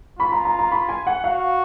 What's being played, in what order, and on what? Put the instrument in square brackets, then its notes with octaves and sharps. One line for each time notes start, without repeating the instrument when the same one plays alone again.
[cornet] F4 [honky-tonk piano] B5
[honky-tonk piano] A#5
A#5
A#5
B5
G#5
F#5
[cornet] F#4 [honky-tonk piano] F5